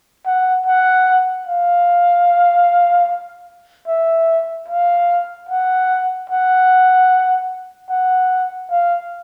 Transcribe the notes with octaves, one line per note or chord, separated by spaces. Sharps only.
F#5
F#5
F5
E5
F5
F#5
F#5
F#5
F5